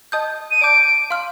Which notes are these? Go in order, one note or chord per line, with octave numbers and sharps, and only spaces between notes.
D#5 A5 D#6 G6
D#7
D5 A5 D6 G6 D7
F5 C6 F6